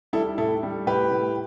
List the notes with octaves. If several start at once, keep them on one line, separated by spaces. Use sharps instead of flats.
G3 E4 A4
A2 E4 A4
G3
A2 G4 B4
A2